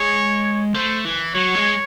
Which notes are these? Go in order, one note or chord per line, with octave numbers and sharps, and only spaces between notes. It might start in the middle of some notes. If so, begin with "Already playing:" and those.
Already playing: G#3 C#5
A3 C5
E3
F#3 C#5
G#3